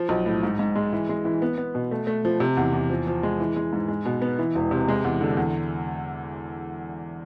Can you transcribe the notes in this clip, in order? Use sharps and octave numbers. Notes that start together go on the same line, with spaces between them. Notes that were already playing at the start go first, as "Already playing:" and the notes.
Already playing: F3
B1
A2
G#2
G#2
G#3
E3
G#3
E3
B3
B3
B2
A3
A3
F3
C3
E2
E2
F3
F3
G#3
E3
G#3
G#2
G#3
B2
B3
E3
E1
C3
G#3
E2
D3
E2